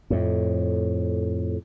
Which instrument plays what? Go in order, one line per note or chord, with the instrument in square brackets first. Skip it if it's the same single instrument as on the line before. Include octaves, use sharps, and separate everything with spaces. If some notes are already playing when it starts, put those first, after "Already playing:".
[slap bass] F2 A2